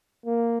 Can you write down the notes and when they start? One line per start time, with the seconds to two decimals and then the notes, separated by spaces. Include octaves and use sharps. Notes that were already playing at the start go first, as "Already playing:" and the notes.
0.26 A#3